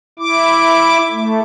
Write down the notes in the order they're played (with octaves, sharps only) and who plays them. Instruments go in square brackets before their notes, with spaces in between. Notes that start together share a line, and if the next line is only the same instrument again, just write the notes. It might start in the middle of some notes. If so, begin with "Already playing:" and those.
[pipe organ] E4 D6
A3